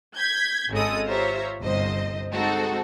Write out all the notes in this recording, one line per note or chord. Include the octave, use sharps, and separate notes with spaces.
G6 G#6 B6
G#1 C#3 G#3 A4 D#6
F4 G4 C5 C#5 E5 A#5
G1 C2 C5 D#5
G#3 C4 D#4 F#4 A4